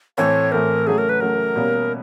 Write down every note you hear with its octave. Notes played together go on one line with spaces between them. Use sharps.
A2 E3 A3 C4 C#5
A2 E3 A3 C4 A#4
C#3 F#3 A3 G#4
A#4
B4
C#3 F#3 A3 A#4
B2 G3 A#3 C#4